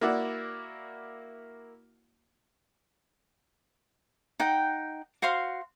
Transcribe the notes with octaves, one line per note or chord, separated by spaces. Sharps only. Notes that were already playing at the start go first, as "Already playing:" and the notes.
A#3 E4 F#4 D5 E5 F#5
D#4 F#5 G5
F#4 C5 F5 C6